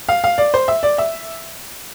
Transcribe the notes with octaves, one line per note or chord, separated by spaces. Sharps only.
F5
F5
D5
C5
E5
D5
E5